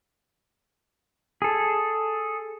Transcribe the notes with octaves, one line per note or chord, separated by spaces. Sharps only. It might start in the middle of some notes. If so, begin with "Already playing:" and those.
G#4 A4